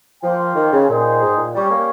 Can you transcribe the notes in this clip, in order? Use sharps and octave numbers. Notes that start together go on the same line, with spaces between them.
F3 A#3 F4 C5 G5
D#3
C#3
A#2 D#4 G#4 C5 G5
G#2
A#2
G3 C#4 G4 C#5
A#3